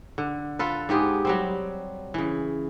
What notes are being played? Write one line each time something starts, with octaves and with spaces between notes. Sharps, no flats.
D3
F4 A4 B4
G#2 B3 G4 G#4
F#3 G3 C4
C#3 E3